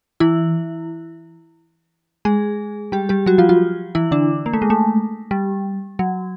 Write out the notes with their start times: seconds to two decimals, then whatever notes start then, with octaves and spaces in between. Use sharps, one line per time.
0.20 E3 E4
2.25 G#3 G#4
2.92 G3 G4
3.09 G3 G4
3.26 F#3 F#4
3.38 F3 F4
3.49 F3 F4
3.95 E3 E4
4.11 D3 D4
4.46 A#3
4.53 A3
4.62 G#3
4.70 A3
5.31 G3
5.99 F#3